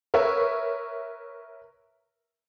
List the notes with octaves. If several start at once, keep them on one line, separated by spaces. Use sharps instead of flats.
A#4 B4 C#5 E5